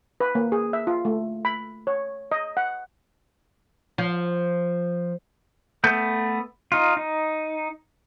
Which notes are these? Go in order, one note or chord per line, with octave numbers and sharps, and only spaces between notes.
B4
A#3
G#4
E5
F4
A3
B5
C#5
D#5
F#5
F3
A3 B3 G6
D#4 F4
D#4